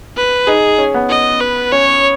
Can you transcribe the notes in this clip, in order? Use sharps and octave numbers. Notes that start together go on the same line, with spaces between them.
B4
D#4 G#4
C#4
B3
D#5
B4
C#4 C#5